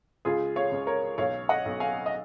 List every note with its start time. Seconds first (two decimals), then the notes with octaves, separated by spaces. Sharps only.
0.25 C#2 F4 G#4
0.56 C#5 F5
0.72 C#2
0.87 A#4 C#5
1.18 B1 C#5 F5
1.49 D#5 F#5
1.65 B1
1.80 F5 G#5
2.06 D#5